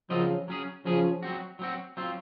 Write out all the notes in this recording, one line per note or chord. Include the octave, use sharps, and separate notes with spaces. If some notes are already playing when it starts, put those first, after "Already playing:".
C#3 F3 F#3 C4 F4 A#4 D#5
F#3 C#4 G#4
C#3 F3 F#3 C#4 G#4
F#3 C4 F#4
F#3 C4 F#4
F#3 C4 F4